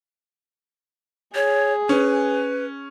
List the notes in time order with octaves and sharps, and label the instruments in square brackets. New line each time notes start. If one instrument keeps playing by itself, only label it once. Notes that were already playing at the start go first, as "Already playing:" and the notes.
[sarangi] G#4 [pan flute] C#5
[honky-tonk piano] C#4 [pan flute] B4